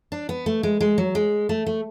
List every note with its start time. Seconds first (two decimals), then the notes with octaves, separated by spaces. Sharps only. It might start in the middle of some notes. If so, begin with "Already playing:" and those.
0.12 D4
0.29 B3
0.46 A3
0.63 G#3
0.81 G#3
0.98 F#3
1.15 G#3
1.49 A3
1.67 A3